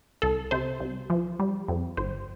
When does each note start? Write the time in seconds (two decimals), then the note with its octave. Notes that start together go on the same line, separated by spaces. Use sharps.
0.22 C2 A4
0.51 C3 C5
0.80 C2
1.10 F3
1.40 G3
1.68 F2
1.97 G1 C5